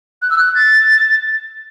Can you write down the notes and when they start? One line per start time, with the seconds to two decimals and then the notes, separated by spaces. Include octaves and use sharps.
0.22 F#6
0.30 E6
0.38 F#6
0.55 A6